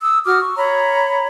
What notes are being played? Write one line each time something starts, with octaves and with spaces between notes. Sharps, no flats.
D#6 E6
F#4 D6 D#6 F6
C#6
C#5 A#5 B5